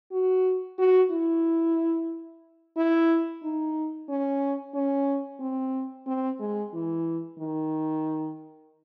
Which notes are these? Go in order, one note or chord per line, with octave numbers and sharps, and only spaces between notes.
F#4
F#4
E4
E4
D#4
C#4
C#4
C4
C4
G#3
E3
D#3